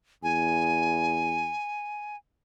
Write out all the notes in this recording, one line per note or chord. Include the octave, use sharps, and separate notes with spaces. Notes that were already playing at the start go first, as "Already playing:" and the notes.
E2 G#5